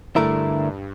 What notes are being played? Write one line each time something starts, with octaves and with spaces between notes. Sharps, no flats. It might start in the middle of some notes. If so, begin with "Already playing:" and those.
G2 D3 A3 E4 A#4